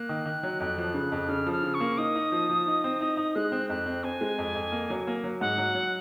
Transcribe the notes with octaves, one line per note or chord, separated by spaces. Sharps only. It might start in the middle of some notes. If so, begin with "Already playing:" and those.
Already playing: A#3 F#6
D#3
D#3
F#3
F2
F3
C#3
F2
C#3 F6
F3
F6
C#3
C#6
A#3
D#4 D#6
D#4
F3
F3
D#4
C4
D#4
D#4
G#3 F#6
C4
F2 F#6
C4
C4 G#5
G#3
F2
F2
A#3
F#3
A#3
F#3
G#2 F#5
F#3
F#3